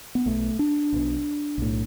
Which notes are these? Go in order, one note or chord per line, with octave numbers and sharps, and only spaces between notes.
B3
B1 B2 A3
D4
B1 B2
B1 A2